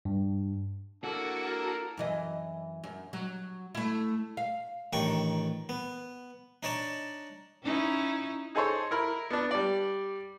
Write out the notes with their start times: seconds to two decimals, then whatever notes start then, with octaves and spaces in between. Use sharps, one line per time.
0.05 G2
1.04 A#3 D4 E4 F#4 A4
1.45 A#4
1.97 F#2 E3 D#5
2.84 F#2
3.13 F#3
3.75 A3 E4
4.37 F5
4.93 A1 D#3 D4 G5 C#6
5.69 B3
6.63 D4 D#4 C#5 D5 A5
7.63 C#4 D#4 E4
8.55 D#4 G#4 A4 C5 C#5
8.91 E4 A#4 B5
9.30 B3 D4
9.51 G3 D5